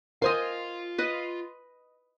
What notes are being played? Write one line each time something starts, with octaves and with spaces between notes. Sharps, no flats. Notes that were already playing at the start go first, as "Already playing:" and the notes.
F4 A#4 C5 D#5 F5 G#5 C6 D#6
B4 D#5